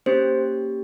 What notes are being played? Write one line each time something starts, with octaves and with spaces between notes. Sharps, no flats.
A#3 C#4 G4 C5